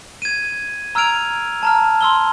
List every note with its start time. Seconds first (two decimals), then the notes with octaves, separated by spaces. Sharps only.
0.22 G#6 D#7
0.95 A#5 E6 F6 G#6 D7 F7
1.63 A5 A#5 F6
2.01 C6 E6 G7